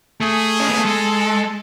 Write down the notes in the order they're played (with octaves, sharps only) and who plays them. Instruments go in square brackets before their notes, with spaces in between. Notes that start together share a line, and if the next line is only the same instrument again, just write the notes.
[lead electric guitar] A3 [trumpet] G#4
[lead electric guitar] C#4
B3
A3
[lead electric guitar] G#3 [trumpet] A4